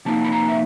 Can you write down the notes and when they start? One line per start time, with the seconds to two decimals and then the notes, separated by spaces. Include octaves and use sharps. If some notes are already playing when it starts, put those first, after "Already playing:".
0.05 C3 F3 A#3 D#4 A5
0.25 B5
0.32 A#5
0.48 E5